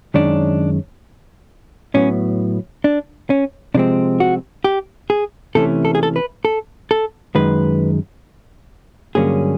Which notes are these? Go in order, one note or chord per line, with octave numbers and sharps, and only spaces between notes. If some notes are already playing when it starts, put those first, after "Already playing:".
F#2 D#3 G#3 C#4 D4
A2 F#3 B3 C#4
D4
C#4
C3 F3 G#3 C4 D4
F#4
G4
G#4
C3 E3 A3 C#4 A4
A4
G#4
A4
B4
A4
A4
F#2 D#3 G#3 B4
G2 D3 F#3 A#3 C#4 G#4